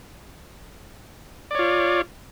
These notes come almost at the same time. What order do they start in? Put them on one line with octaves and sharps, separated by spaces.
D5 C#5 F4